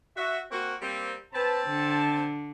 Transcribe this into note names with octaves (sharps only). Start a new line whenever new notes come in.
F#4 E5
A#3 C4 F#4
G3 A#3 C4
C4 B4 A5
D3